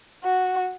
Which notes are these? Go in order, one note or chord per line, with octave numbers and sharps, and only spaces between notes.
F#4